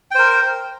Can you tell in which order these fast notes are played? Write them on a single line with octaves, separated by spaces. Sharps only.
G5 C5 A#4